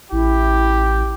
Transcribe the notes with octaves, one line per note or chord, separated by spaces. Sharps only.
A1 E4 G4